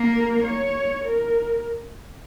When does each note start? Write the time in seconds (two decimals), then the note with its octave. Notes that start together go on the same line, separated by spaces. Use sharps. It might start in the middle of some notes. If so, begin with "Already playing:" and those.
Already playing: A#3
0.13 A#4
0.44 C#5
1.05 A#4